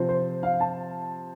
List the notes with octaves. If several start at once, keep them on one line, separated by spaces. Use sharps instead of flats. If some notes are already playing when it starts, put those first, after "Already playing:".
Already playing: C3 F3 C4
C5
F5
A5